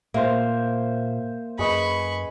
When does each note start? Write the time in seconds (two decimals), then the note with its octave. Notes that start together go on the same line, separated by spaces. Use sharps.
0.14 A#2 A#3 C5 E5
1.59 F#2 G#4 B4 D#5 B5 C#6